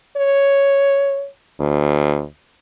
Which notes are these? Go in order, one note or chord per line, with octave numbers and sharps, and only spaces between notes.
C#5
D2